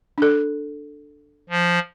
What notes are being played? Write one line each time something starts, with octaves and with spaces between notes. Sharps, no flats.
D4 A4
F3